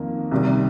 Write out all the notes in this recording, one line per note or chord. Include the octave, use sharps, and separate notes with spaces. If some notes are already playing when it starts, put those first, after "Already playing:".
Already playing: F2 D#3 A#3
C2 C3 D#3 G3